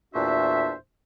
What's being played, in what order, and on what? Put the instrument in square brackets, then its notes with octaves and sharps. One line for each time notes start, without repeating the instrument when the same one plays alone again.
[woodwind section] E2 A#2 D4 F#4 C5 E5